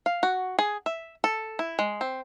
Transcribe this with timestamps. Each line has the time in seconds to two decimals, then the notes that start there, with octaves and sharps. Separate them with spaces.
0.06 F5
0.23 F#4
0.59 G#4
0.86 E5
1.24 A4
1.59 E4
1.79 G#3
2.01 C4